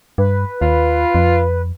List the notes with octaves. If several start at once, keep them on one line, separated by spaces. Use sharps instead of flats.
G2 B4
D#2 F4
F2